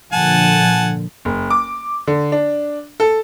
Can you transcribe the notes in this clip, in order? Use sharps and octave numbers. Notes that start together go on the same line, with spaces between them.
A#2 D3 F3 F#5 G#5 A5
F#1
D6
D3
D4
A4